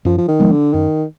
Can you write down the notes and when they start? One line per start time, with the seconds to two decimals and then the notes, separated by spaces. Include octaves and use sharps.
0.05 F#2 F3
0.18 F3
0.28 D#3
0.40 F3 G#3 B3
0.51 D3
0.73 F#2 D#3